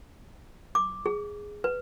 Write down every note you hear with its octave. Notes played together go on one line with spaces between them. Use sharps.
D6
G#4
B4